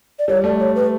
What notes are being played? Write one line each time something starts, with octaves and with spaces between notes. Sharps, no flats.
D5
G3 C#5
A3 D5
C#5
B4